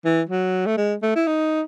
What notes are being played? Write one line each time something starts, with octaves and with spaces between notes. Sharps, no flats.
E3
F#3
A3
G#3
A3
E4
D#4